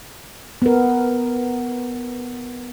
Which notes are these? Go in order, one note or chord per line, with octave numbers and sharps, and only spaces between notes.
B3 A#4